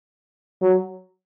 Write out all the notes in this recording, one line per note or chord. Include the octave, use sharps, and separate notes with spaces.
F#3